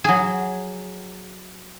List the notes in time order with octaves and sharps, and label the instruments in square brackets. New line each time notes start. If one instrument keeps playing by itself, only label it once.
[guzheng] F#3 G#4